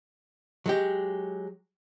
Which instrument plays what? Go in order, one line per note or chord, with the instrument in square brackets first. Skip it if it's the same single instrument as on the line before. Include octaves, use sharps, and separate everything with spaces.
[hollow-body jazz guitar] F#3 G#3 G4